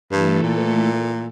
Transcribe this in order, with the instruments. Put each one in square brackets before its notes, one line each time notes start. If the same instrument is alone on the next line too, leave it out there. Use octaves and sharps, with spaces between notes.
[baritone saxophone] G2 [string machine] E3 A3 A4
[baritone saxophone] A#2